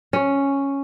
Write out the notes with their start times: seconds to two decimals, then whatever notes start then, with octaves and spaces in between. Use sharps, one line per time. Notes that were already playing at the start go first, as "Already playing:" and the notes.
0.13 C#4